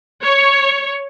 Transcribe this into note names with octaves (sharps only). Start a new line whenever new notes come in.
C#5